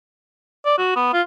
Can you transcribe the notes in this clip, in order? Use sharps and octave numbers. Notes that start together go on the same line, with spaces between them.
D5
F#4
B3
F4